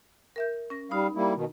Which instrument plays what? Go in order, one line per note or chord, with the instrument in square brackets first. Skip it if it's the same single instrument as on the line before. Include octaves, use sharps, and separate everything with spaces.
[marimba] A#4 E5 G6
C#4 A#6
[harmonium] G3 F5 [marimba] D#4 B5
[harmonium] G3 A#3 E4
B2 D#3